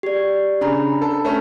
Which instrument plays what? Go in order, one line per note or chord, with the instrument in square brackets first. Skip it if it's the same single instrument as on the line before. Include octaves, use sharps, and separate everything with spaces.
[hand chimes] G4 D5
[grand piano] C#3 [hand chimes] D4 A#5 B5
[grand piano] A4
A3 C#4